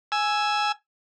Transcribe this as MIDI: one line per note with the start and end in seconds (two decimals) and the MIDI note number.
0.12 0.72 80
0.12 0.72 88